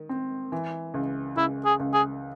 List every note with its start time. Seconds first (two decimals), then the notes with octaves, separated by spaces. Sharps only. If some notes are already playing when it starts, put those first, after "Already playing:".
Already playing: D#3
0.09 C4
0.52 E3
0.94 C#2
1.37 C#2 E4
1.65 G#4
1.80 C#2
1.93 G#4